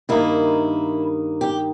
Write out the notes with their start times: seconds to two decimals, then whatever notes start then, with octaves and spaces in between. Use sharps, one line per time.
0.09 G2 D#3 A#3 D#4 E4
1.41 G4